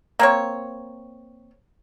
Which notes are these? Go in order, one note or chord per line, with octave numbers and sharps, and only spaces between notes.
A#3 C4 C#5